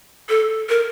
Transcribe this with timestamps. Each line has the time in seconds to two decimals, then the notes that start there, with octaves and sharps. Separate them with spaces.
0.29 A4
0.69 A#4